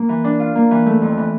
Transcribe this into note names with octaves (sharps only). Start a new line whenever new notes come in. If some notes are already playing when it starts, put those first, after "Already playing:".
Already playing: A#3
E3
D4
F4
A#3
E3
A3
F2
E3